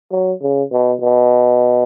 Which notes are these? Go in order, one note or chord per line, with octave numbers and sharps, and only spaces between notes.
F#3
C#3
B2
B2